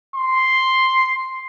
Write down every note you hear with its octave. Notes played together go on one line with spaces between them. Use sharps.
C6